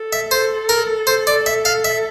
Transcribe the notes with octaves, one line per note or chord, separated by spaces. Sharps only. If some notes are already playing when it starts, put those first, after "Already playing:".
Already playing: A4
E5
C5
A#4
C5
D5
E5
F5
E5